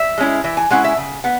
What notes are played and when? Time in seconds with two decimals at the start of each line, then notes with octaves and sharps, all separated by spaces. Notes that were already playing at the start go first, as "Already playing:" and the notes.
Already playing: E5
0.18 G#3 C#4 E4
0.44 E3 E5
0.57 G#5
0.70 G#3 C#4 E4 F#5
0.84 E5
0.97 C#3
1.24 B3 F#5